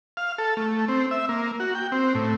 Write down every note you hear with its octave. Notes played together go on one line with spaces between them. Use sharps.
F5
A4
A3
C4
E5
A#3
F#4
G5
C4
A2